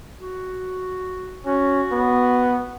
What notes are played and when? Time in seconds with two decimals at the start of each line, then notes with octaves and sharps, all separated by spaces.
0.18 F#4
1.46 C#4 F#4
1.92 B3